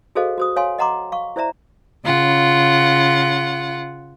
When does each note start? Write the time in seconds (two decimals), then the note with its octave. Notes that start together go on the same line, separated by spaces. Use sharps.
0.15 F#4 G#4 A4 C5 D#5 F5
0.38 F#4 C5 D#6
0.56 C#5 F5 G#5 C6
0.79 D#5 F#5 A#5 C6 D6
1.12 F5 C#6
1.36 E4 C5 D5 E5 A#5
2.04 C#3 F4 F#5